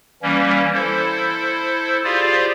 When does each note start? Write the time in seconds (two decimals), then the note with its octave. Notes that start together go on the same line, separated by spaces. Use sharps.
0.23 E3 G3 A#3 C#4
0.74 E4 A4 C5
2.04 F4 G4 G#4 C5 D5 F5